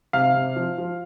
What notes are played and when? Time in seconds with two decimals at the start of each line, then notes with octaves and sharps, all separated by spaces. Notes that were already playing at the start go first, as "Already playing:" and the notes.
0.13 C3 F5
0.34 C3
0.56 F3
0.78 F3